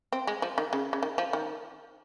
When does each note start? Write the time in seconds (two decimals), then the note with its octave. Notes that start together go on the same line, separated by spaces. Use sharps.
0.12 C4
0.27 G#3
0.42 F3
0.58 D#3
0.73 C#3
0.93 C#3
1.03 D#3
1.18 F3
1.33 D#3